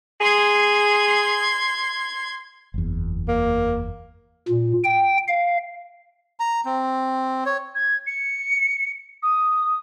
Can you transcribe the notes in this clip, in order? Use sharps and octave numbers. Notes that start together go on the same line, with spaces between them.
G#4 C6 G#6
F#1 E2
A#3
A#2
G5
F5
A#5
C4
C#5
G#6
C#7
D#6